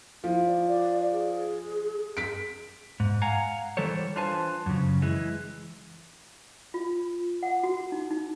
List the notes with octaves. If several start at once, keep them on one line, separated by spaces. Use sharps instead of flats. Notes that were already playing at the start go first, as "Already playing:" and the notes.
F3 E4
D5
D5
G#4
B6 D7
G#2
F5 F#5 G#5 A#5
E3 G3 A4 C5 C#5
D4 F4 B4 C5 G#5 A5
F#2 C#3
E3 G#3
F4
F#5
F#4
D#4
D#4